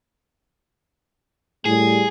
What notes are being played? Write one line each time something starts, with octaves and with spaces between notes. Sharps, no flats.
A2 G3 G#4